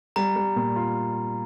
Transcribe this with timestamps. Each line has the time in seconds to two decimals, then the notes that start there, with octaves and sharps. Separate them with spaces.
0.16 G3 A#5
0.36 G3
0.56 A#2
0.76 F4